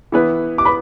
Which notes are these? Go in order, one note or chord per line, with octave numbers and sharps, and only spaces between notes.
E3 B3 E4 B4
D6
B4 B5